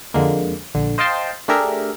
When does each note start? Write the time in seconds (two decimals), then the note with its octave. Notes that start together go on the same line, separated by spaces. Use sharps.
0.14 F2 D3 G#3 A#3
0.75 A#1 D3
0.98 C5 D#5 F5 G5 A5 C6
1.48 A3 D4 G4 G#4 A#4 E5